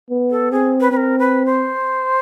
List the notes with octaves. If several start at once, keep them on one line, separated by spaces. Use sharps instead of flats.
B3
A4
C4 G#4
B4
C4 B4
A#4
B4
C5